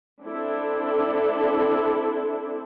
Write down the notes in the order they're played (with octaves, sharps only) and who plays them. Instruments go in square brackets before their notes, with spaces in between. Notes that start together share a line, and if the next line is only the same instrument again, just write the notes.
[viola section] C4 D4 E4 A4